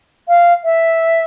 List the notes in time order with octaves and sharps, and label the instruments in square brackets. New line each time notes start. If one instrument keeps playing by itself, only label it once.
[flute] F5
E5